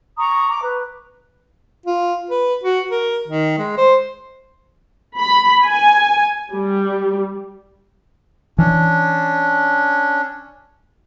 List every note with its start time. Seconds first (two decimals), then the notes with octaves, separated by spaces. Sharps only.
0.17 A#5 C#6 D#6
0.49 A#5 D6
0.61 B4
1.86 F4
2.30 B4
2.64 F#4
2.91 A#4
3.28 D#3
3.58 G#3
3.77 C5
5.18 B5
5.66 G#5
6.52 G3
8.58 E3 C#4 D4